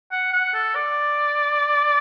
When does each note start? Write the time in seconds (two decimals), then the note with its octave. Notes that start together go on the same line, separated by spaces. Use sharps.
0.11 F#5
0.33 F#5
0.54 A4
0.75 D5